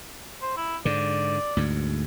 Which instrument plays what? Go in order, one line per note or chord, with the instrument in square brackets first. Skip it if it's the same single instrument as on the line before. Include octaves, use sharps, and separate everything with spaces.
[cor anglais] C5
E4
[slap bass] G#2 D3 [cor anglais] D5
[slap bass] D2 G#2